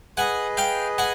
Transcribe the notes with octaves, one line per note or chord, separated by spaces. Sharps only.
G#4 B4 D#5 F#5 G#5
F5 G5
F#5 G#5